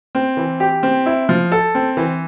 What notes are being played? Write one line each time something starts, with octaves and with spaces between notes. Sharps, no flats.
C4
E3
G4
C4
E4
F3
A4
C4
E3